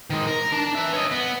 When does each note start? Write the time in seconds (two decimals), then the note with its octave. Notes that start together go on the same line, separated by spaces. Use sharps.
0.10 D#3 G#3
0.27 A#4
0.52 D4 A5
0.75 B4 E5
0.94 C#5 D#5
1.11 B3